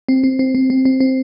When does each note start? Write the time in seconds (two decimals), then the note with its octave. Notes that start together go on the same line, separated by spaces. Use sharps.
0.09 C4
0.24 C4
0.39 C4
0.55 C4
0.70 C4
0.85 C4
1.00 C4